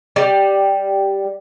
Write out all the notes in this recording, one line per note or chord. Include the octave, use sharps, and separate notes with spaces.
G3